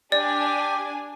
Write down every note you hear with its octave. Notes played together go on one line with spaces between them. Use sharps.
D4 G4 D5 G#5